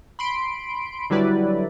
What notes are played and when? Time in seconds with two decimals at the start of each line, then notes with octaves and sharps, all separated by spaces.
0.19 B5 C6 D7
1.10 D3 F#3 G3 E4 B4 D5